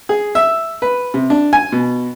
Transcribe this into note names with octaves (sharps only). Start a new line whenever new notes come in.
G#4
E5
B4
C3
D4
G#5
B2